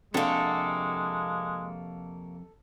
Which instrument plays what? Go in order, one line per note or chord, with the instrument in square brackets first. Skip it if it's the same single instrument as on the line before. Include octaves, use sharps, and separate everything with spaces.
[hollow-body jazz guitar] F2 C3 D4 [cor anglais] G#3 [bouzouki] A#3 F#4 [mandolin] A4